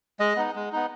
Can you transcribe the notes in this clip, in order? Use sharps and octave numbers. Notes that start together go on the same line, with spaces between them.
G#3 D#5
B3 D#4
G#3
B3 D#4